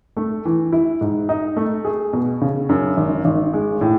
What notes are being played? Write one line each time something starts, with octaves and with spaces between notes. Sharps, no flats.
A3
E3
E4
G#2
D#4
A3
G#4
B2
C#3
F#2
G#1
G#1
G#3
A2